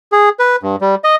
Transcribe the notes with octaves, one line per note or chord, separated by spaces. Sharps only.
G#4
B4
G2
G3
D#5